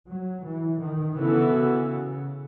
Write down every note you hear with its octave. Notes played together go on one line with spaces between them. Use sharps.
F#3
E3
D#3
C#3 E3 B3 F#4 A4
C#3